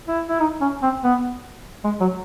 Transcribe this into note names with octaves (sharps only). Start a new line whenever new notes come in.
E4
E4
D#4
C#4
C4
B3
G#3
F#3